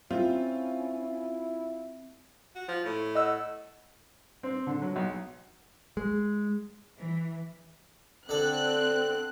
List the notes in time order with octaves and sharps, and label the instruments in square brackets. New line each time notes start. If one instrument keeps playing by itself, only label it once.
[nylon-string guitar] C4 [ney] C#4 [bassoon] E4 [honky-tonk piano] F4
[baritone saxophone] F#4
F3
A2
[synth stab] D#5 F#5 E6
[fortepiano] C4
D3
F#3
B1
[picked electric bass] G#3
[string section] E3
[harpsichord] D3 A4 [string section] C4 F#6